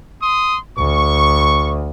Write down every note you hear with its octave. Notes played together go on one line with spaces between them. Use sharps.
C6 D#6
D2 C#6